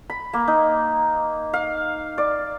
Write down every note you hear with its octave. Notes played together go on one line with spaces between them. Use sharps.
B5
A#3
D#4
F5
D5